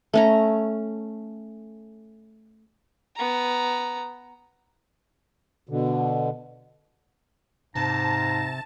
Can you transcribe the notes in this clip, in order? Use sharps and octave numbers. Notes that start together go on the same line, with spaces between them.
A3 C#4 A#5
B3 A#5
B2 D3
G#2 C3 A5 A#5